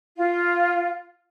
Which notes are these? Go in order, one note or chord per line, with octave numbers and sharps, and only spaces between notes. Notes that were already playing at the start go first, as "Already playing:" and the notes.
F4